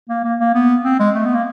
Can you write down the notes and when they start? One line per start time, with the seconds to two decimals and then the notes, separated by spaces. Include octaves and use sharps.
0.09 A#3
0.24 A#3
0.40 A#3
0.54 B3
0.84 C4
1.00 G#3
1.15 A3
1.25 B3
1.35 A#3